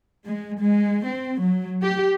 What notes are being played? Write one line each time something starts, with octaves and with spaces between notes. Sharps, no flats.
G#3
G#3
C4
F#3
G4